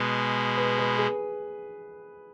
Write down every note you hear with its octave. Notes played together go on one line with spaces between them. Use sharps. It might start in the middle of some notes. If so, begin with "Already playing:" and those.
Already playing: B2 G#3 B3 G#4
B4
B4
G#4